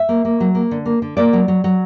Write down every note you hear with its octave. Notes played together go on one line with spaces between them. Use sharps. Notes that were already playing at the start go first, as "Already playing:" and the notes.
Already playing: E5
A#3
A#3
F#3
A#3
D3
A#3
D3
A#3 D5
F#3
F#3
F#3